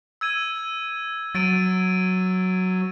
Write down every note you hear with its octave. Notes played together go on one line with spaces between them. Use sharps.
E6 G#6 D#7
F#3 A6 D7 D#7